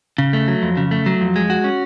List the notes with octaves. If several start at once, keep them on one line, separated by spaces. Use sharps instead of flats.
C#3
A3
F#3
F2
C#3
A3
F#3
F2
G#3
F#4
C#4